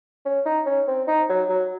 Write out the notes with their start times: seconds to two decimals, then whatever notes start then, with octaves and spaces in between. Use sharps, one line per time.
0.25 C#4
0.46 D#4
0.66 C#4
0.88 C4
1.08 D#4
1.29 F#3
1.49 F#3